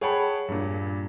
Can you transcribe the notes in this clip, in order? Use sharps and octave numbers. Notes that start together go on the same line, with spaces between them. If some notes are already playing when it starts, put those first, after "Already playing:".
G#4 C#5 F#5 G5 A5 B5
G2 A#2